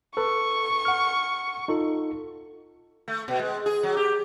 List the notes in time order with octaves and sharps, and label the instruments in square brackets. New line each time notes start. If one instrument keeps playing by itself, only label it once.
[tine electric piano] A4 B4 [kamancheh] C#6
[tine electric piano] F#5 F6
D#4 F4 A4
[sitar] A3
B2
G#3
G#4
F#3
G4